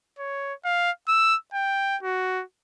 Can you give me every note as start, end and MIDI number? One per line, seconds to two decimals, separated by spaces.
0.19 0.54 73
0.65 0.91 77
1.08 1.36 88
1.54 1.97 79
2.03 2.43 66